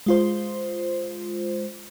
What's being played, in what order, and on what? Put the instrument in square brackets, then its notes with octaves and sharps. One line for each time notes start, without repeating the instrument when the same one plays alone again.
[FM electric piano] G#3 F4 C5